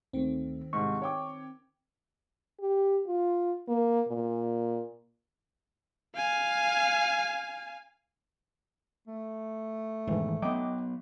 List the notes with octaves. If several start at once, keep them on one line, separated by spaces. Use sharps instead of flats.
D2 D#3 A3 C4
C2 G#2 C#6
C#5 G5 D6
G4
F4
A#3
A#2
F5 G#5
A3
E1 G#2 D#3 E3
F#3 B3 D#5 G5 D6